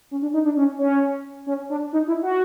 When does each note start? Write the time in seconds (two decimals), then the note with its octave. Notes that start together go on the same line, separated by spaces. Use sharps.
0.11 C#4
0.22 D4
0.34 D#4
0.45 D4
0.57 C#4
0.79 C#4
1.47 C#4
1.70 D4
1.93 D#4
2.08 E4
2.23 F#4